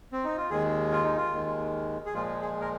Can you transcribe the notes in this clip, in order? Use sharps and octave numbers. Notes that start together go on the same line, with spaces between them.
C4
D#4
F4
D#2 D#3 G#3 G#4
F4
D#4
F4
D#2 D#3 G#3
G#4
A#2 F3 G#3 F4
G#4
A#4